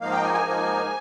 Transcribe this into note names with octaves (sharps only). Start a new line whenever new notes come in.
G#2 F3 A#3 D#4 F5
G5
G#5
G#5
G#2 F3 A#3 D#4